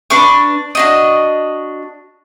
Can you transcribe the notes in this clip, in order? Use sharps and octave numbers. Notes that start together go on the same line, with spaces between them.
D4 B4 C#6 D6
D4 F#4 D#5